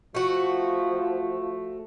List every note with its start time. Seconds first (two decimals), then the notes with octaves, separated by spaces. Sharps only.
0.15 F3 A3 F#4